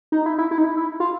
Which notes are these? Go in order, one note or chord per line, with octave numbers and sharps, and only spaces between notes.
D#4
E4
E4
E4
D#4
E4
E4
F4